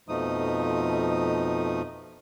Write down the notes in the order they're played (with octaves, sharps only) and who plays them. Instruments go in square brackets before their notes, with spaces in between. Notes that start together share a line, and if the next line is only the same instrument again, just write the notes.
[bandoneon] F2 B2 F3 A3 D#4 D#6